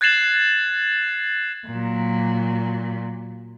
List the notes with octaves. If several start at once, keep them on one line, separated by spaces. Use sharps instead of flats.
F#6 G#6 A6 C7 E7 F#7
A#2 F#3